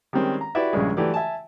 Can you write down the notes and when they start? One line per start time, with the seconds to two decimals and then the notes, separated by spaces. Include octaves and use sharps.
0.13 D#3 G3 G#3 C4 C#4
0.41 A#5
0.55 E4 F#4 G4 B4 D5 E5
0.73 A#1 G2 C#3 G#3
0.97 E3 F#3 A3 G4 A4 D5
1.14 E5 G#5 A5